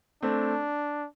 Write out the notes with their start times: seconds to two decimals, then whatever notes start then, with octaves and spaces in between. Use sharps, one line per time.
0.23 A3 C4 D4